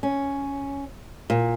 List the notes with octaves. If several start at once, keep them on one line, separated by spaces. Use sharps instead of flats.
C#4
A#2